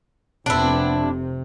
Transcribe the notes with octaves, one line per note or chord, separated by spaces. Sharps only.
F1 B3 C4 D4 E4
C3